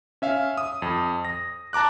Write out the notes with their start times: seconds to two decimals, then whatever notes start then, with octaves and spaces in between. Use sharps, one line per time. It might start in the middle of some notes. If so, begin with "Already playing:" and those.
0.22 C#4 E5 F5
0.57 D#6
0.82 F2
1.25 A#6
1.73 A5 A#5 D6 F#6